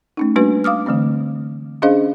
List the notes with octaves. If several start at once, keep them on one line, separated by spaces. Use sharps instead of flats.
A3 C#4 D#4
G3 A#3 D4 F#4 B4
F5 D6 D#6 F6
D3 E3 A3 C4
C#4 D4 G#4 C5 D#5 F5